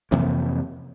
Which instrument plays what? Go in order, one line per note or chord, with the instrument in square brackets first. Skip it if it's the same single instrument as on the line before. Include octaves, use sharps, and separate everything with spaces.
[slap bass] F2 C3 E3 A#3